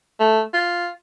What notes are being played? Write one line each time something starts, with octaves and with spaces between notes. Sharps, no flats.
A3
F4